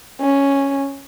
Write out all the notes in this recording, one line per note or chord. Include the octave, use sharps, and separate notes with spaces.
C#4